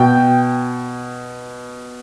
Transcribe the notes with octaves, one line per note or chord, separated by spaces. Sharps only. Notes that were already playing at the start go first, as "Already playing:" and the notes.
Already playing: B2 G5